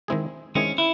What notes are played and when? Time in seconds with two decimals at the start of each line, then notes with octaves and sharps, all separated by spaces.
0.08 D#3 G#3 C4 E4 G#4
0.55 D#3 G#3 C4 C#4 E4 G#4
0.78 E4